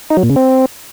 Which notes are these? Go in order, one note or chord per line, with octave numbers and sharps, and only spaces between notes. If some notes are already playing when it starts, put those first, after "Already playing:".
D#4
F#3
A#2
C#3
C4